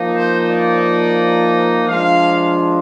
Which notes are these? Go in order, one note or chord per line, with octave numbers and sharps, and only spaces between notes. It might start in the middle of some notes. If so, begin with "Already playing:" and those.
Already playing: F3 A#3 D#4
C5
D5
F3 G#3 D4 F5